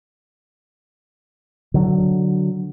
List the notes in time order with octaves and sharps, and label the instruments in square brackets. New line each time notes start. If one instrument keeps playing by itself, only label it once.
[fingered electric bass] D3 F#3